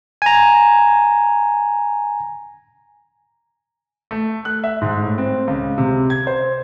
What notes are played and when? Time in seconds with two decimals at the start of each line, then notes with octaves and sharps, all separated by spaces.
0.22 G#5 A#5
4.11 A3
4.45 F#6
4.64 E5
4.81 G#2
5.02 A2
5.18 C4
5.47 C#2
5.78 C3
6.10 G#6
6.27 C5